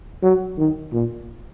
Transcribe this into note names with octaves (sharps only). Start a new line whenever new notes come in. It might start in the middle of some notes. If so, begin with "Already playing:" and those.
F#3
D#3
A#2